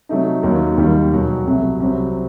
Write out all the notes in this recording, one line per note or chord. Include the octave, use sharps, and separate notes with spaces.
C3 F#3 A3 D#4
D#2 D#3 F#3
D#2 D#3 G3
E2 B2 F#3
C2 C3 F#3 A3
C2 C3 F#3 C4